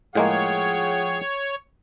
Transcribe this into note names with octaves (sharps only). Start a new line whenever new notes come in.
A2 F3 G#3 A#3 G#4 C#5 F#5 G5